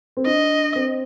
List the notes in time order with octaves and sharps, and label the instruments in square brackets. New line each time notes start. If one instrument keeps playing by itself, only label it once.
[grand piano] C4
[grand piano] D4 [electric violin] D#5
[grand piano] C4